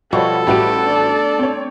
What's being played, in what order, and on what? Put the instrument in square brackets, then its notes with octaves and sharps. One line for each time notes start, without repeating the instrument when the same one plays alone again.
[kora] B2 F3 G3 [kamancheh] B3 F#4 [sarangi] A4 [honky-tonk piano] C#5 C#6
[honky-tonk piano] A1 F#4 D7 [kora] G3 A3 B3 [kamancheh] G4
[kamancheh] D4 D5
[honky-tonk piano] C4 C#5